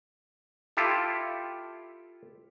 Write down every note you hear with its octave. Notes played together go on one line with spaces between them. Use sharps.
E4 F4 G4 A4